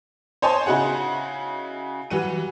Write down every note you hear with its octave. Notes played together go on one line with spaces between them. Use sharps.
C5 C#5 D#5 G#5 A5 C6
C#3 D#4 E4 F#4 G#4 F#5
E3 F#3 G3 F#4 D#7